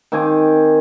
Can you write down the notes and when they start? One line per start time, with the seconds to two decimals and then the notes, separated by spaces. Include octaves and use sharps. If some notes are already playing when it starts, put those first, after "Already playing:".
0.12 D#3 C4 G#5 D6